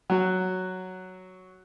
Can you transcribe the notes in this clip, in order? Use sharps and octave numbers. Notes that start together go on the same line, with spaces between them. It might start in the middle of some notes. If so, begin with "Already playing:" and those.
F#3 F#4